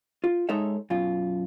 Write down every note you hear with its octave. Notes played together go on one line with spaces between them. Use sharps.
F4
G#3 D#4 A4 C#5 E5
F#2 B2 F4